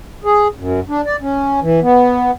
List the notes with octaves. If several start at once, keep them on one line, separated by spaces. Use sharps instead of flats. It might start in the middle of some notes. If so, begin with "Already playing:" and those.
G#4
F#2
D4
D5
C#4
E3
B3